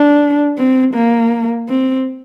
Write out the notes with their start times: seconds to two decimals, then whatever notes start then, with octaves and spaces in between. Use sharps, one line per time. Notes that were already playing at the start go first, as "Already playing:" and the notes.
Already playing: D4
0.58 C4
0.95 A#3
1.69 C4